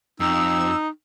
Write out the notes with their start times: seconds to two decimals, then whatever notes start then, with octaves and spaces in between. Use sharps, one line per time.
0.20 F2 D#4 E6